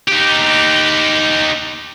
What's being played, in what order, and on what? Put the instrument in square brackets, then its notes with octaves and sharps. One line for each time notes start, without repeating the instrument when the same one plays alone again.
[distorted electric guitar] D#4 G4